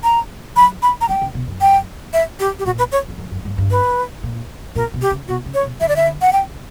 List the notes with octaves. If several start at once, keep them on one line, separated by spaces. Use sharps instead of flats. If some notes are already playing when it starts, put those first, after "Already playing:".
A#5
F#3 B5
B5
A#5
G3 G5
C#3
B2
F#2
G5
E5
G4
G4
A#2 F#4
B4
C#5
E2
F#2
F#2
G2
G2
B4
A#2
A#2 A#4
B2
G4
C#3
B2 F#4
C#3
C#5
B2
D3 E5
D5
E5
F#5
G5